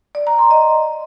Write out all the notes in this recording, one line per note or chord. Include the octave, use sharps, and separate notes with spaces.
D5
A#5
C6
D#5